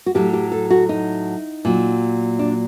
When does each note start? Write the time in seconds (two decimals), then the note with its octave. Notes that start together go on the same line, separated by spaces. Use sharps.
0.06 F#4
0.15 A2 F#3 G4
0.33 G4
0.52 A4
0.70 F#4
0.89 D#4
1.65 A#2 F#3
2.39 D4